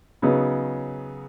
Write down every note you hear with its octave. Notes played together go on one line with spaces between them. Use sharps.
C#3 F#3 B3 D#4